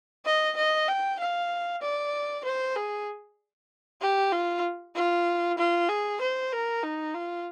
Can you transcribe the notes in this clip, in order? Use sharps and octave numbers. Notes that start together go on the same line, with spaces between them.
D#5
D#5
G5
F5
D5
C5
G#4
G4
F4
F4
F4
G#4
C5
A#4
D#4
F4